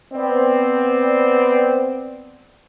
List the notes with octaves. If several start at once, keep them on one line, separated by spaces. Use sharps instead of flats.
B3 C4 D5